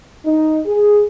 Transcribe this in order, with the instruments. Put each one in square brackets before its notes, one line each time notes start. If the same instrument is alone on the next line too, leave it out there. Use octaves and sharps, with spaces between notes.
[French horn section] D#4
G#4